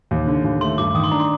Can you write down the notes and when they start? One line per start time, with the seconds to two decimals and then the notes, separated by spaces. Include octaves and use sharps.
0.11 D#2
0.27 D3
0.44 D#2
0.61 A3 C6
0.78 G2 D6
0.95 D#3 D#6
1.04 C6
1.11 D4 A#5
1.20 C6